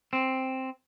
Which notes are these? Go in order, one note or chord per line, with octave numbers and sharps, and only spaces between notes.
C4